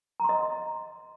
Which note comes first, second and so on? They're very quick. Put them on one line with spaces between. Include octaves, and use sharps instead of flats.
A#5 C6 D#5